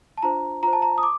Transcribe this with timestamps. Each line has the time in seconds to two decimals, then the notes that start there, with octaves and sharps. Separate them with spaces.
0.18 A5
0.23 D4 F4 C5 A#5
0.63 F4 C5 A#5
0.73 A5
0.82 A#5
0.98 D#6
1.03 D6